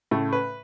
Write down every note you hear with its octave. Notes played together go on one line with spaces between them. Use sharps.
A2 C#3 A3
B4